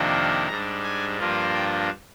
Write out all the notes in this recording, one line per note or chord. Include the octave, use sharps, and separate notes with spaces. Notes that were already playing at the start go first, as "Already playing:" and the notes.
Already playing: F2 C3 D#3 A#3 D4
G#2 G3 D4 A#5
G#5
G2 F3 A#3 D4 F4
G5